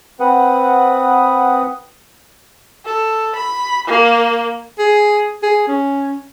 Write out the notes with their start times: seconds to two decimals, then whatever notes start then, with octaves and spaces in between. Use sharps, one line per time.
0.20 C4 B4 F#5 D#6
2.85 A4
3.35 B5
3.87 A#3
4.79 G#4
5.43 G#4
5.68 C#4